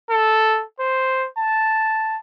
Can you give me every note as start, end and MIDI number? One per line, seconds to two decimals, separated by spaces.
0.10 0.63 69
0.80 1.28 72
1.38 2.18 81